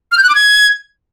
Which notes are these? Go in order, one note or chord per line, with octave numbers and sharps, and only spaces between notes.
F6
G6
F#6
D6
G#6